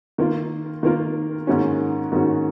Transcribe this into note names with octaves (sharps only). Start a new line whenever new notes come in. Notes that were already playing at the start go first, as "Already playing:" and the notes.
D#3 A#3 F4 A#4
D#3 A#3 F4 A#4
G#2 D#3 A#3 C#4 F#4
G#2 D#3 A#3 C#4 F#4